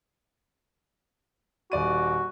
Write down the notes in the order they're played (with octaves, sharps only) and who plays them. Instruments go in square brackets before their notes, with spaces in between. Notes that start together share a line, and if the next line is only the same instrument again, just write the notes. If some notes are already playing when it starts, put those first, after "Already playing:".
[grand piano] D#1 D5 D#7 [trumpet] F#4